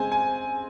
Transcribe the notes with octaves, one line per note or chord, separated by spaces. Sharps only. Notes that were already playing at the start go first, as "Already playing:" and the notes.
Already playing: C#3 G#3 C4 C5 G#5
G#5